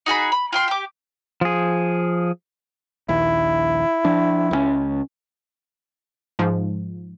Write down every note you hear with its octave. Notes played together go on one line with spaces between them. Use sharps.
D#4 F#4 G#4 B5
B5
F4 G5 C6
G4 D6
F3 G#4
A#1 D#2 E4
F3 D4
C#2 F3 C#4
G#2 F3